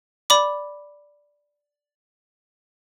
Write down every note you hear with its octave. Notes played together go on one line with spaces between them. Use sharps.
D5 B5 D6